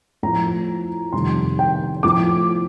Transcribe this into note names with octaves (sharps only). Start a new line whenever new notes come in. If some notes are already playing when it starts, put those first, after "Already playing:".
A2 F3 A#5
F2 C3 D#3 G3 C6
G5
A2 F3 D6